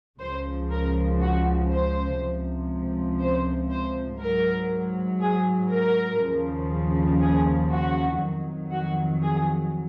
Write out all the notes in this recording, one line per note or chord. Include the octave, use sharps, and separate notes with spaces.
C#2 C#3 F3 C5
A#4
F#4
C5
C#2 C3 F3
C5
C5
G#2 F#3 A#4
G#4
A#4
D#2 C#3 F3
G#4
F#4
F2 D#3 F#3
F#4
G#4